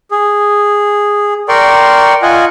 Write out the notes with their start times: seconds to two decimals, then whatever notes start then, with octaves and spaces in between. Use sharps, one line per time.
0.11 G#4
1.49 A#4 D5 G5 C6 C#6
2.22 F4 D#5 F#5 G#5